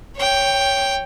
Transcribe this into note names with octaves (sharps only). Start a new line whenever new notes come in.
C#5 G5